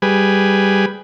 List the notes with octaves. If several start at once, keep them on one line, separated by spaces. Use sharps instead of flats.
G3 G#4 B4